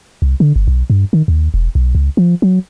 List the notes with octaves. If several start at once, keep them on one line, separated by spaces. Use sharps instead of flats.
C2
D3
G1
B1
G2
D#3
D#2
E1
B1
C#2
F3
F#3